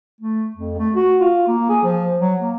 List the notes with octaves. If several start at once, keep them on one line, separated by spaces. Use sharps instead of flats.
A3
F2
A3
F#4
F4
A#3
G#4
F3
F#3
A#3